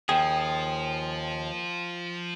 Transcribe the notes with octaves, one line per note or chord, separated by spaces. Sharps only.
D#2 F3 G#4 G5